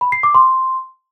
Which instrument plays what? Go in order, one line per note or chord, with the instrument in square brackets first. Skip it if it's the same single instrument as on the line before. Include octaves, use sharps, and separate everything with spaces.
[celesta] B5
C7
D6
C6